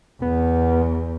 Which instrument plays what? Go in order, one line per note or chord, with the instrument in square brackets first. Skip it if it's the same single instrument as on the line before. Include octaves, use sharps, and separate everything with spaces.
[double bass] E2 [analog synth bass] B3